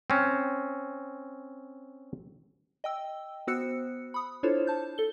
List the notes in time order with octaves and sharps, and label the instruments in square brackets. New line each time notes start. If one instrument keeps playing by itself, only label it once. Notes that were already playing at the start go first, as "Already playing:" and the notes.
[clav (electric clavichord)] C4 C#4
[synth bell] D#5 G5 E6
B3 F#4 C5 E6 F#6 C#7
B5 D#6
D4 E4 F4 A4 C5 C#5
A5 G6
A4 G7